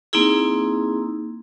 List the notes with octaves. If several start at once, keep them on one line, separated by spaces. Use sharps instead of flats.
A#3 C4 D#4 E4 G#4